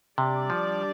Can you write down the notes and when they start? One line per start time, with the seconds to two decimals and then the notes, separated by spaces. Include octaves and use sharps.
0.18 C3 G3 D4 G4 D5
0.50 F3